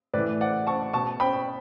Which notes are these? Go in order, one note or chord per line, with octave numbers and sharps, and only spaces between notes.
A2 E3 B4 D5
D5 F#5
A5 C#6
B2 A5 C#6
G5 B5